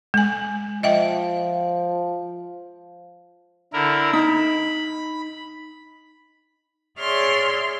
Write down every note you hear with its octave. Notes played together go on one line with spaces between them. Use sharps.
G#3 G#5
F3 D#5 E5 G5
D3 E4 A#4
D#4 B5
G#4 C#5 D5 E5 C6 F6